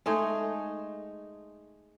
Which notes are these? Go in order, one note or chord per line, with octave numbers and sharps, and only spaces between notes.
G#3 A3 D#4 G#4